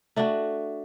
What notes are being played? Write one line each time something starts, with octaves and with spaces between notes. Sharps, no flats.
A3 D4 F#4